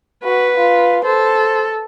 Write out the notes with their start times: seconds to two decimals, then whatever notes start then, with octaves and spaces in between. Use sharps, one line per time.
0.24 F#4 B4 F#5
0.56 F4
1.05 A4 C5